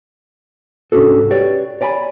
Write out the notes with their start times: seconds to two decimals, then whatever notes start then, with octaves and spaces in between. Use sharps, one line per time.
0.92 C2 G#2 C#4 D4 F#4 A4
1.31 G4 B4 C#5 D5
1.81 C#5 D5 G#5 A#5 B5